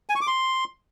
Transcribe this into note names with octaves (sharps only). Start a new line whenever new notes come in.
G#5
C#6
D6
C6